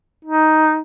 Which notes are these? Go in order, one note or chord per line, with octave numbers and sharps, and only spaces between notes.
D#4